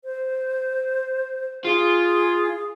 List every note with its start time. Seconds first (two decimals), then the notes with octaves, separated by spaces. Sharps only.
0.04 C5
1.65 F4 G#4